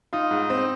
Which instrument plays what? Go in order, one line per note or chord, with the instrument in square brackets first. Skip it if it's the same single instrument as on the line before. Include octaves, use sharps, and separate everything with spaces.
[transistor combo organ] D#4 [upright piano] F4
[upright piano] G#2
C4